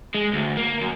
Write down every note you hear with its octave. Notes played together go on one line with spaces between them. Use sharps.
G#3
D2
A#3
F#2